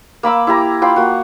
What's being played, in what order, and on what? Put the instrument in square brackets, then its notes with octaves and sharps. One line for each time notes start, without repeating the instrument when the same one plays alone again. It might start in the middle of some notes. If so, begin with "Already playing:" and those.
[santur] A#3 B5 D6 E6
E4 G4 A#5
F4 G5 B5 C6
A#3 F#4